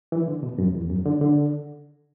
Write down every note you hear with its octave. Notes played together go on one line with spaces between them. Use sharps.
E3
D3
B2
F#2
E2
F#2
D3
D3